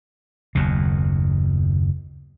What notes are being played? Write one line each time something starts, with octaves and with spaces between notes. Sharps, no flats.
F#1 D#2 B2